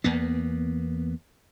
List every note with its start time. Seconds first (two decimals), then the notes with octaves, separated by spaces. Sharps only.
0.04 E2 A#3 B3